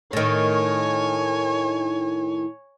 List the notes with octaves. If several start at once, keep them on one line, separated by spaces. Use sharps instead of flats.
A2 D#3 C#5 G#5